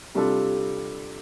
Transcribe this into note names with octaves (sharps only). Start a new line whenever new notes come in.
C3 G3 D4 F4 A4